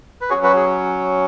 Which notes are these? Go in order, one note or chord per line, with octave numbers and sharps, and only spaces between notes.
B4
F#3 C#4 F#4 G#4 C#5
F#4 B4
G#4